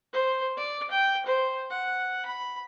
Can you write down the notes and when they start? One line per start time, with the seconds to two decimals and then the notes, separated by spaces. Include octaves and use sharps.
0.13 C5
0.57 D5
0.91 G5
1.26 C5
1.70 F#5
2.26 B5